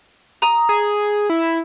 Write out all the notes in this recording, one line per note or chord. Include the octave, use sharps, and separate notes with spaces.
A#5 D#6
G#4
E4